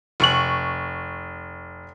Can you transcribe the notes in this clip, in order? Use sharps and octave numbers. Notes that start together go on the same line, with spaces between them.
F1 C#6 F#7